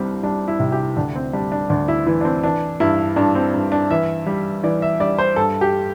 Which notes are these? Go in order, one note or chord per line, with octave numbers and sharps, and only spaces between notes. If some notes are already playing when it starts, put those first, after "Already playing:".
Already playing: C2 G3 C4 D4
G3 D4
E4
C3
G4
D2 D4
C4
G3 D4
D4
D2 D4
E4
E3 E4
D4
C4
E3 D4
G2 E4
G2 D4
C4
G2
D4
E3 E5
G3
E3 D5
E5
G3 D5
C5
G2 A4
G4